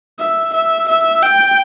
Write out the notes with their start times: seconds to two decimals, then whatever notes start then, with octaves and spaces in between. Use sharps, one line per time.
0.19 E5
0.54 E5
0.89 E5
1.23 G5